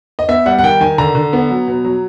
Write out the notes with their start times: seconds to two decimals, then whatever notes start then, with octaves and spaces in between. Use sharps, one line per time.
0.19 D#5
0.28 B3 E5
0.46 G3 F#5
0.59 F#5
0.63 D#3 G5
0.81 D#3 G#5
0.98 D3 A#5
1.15 D3
1.33 B3
1.50 F#3
1.67 B2
1.85 F#3